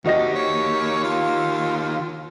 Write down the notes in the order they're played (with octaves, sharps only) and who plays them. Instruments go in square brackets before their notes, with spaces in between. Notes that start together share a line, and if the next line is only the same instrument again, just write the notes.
[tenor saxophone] C3 [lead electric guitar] D#3 G4 [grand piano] F#4 D#5 A#6
[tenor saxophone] C#5
F4